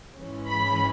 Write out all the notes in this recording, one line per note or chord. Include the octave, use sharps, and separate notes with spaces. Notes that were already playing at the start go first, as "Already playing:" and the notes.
G#2 E3 G#3 C#4
B5